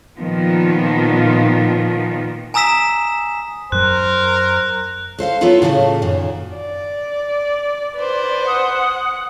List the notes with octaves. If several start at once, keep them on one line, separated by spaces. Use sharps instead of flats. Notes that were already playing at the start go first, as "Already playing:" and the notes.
A#2 D#3 F3 B3
G#5 A#5 D#6 E6 B6 E7
F#2 F#3 A#4 C5 F#6
A4 C5 E5 F5
F#3 B3 E4 F4 A4 B4
A2 C#3 E3 G3 A3 A#3
F#2 A#2 D#3
D5
B4 C5
F#5 D#6